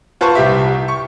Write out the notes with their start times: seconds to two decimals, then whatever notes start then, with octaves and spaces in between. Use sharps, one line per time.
0.21 F4 B4 C5 A5 C#6
0.35 C2 G4 E5
0.88 C#6